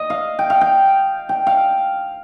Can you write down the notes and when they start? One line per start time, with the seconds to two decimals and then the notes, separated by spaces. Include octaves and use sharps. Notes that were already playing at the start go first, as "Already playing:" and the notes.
Already playing: D#5
0.10 F5
0.39 G5
0.50 F5
0.61 G5
1.29 G5
1.47 F5